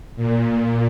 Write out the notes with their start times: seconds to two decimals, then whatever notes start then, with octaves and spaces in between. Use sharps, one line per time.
0.16 A#2